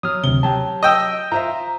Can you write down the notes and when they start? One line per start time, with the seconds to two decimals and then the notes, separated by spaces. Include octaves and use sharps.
0.03 F#3 D#6 F6
0.24 D2 C3 G7
0.43 F#3 G4 A5
0.83 D#5 G5 E6
1.32 F4 C5 E5 A#5